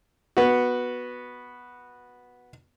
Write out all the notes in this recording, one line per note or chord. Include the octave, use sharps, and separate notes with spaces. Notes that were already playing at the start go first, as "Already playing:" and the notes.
B3 F#4